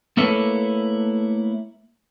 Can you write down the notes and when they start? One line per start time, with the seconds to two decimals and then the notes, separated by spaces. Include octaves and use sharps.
0.17 A3 A#3 E4 A4 B4 C#5